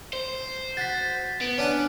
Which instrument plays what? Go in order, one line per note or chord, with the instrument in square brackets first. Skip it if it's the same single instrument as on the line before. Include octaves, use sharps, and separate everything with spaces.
[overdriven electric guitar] C5
[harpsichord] F#4 [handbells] A6 B6
[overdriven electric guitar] B3 [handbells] D7
[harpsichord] C#4 D4 F#5